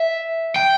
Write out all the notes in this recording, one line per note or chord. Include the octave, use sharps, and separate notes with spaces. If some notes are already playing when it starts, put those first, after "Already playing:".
Already playing: E5
G5